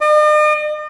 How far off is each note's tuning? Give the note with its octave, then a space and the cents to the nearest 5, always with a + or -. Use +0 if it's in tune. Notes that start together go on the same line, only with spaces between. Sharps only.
D#5 -45